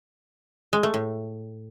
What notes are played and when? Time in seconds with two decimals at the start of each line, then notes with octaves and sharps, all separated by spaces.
0.73 G#3
0.83 A3
0.94 A2